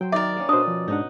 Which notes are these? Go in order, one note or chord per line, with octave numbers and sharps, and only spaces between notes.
F#3 C5 G5
D#3 D#4 A#4 D5 E5
A#3 C#4
B2 D4 C5 D#5 D#6
F3
G#2 D4 D#4 D#5 F#5